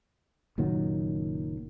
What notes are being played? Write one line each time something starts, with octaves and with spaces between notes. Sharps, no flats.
F#1 A#2 D#3 F#3